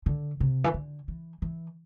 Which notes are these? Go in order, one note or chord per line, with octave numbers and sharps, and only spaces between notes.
D3
C3
E3
D3
E3
E3